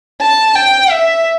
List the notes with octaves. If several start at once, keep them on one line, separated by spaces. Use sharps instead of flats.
A5
G5
E5